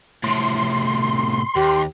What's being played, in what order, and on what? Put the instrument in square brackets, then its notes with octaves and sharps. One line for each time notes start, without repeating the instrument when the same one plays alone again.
[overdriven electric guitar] A2 C3 [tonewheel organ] C6
[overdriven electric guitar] D#2 [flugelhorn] G4